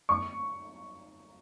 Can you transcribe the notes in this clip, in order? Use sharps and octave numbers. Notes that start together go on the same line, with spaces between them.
C#6